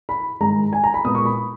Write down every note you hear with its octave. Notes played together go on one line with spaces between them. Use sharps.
B5
G#2 D#3 G#3 A#5
G#5
A#5
B5
A#2 G#3 B3 D#6
C#6
B5